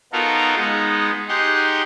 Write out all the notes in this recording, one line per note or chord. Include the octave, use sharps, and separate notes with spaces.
B3 D#4 F4 F#4 A4 A#4
G#3 B3 D#4
D#4 G4 G#4 F#5 C6